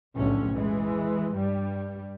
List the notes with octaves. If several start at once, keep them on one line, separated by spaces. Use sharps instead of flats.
F1 B1 A2 D3 C#4
E3 G#3
G2 G3